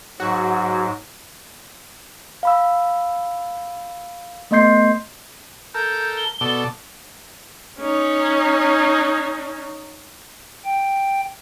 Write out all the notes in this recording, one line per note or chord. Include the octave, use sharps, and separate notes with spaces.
G#2 F#3 F#4
F5 B5 E6
A3 B3 D#5 C6 G6 C7
A4 A#4 G6
G7
B2 A4 D5
C#4 D#4
G5